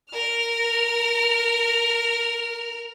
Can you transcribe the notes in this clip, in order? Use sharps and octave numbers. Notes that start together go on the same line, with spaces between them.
A#4 F6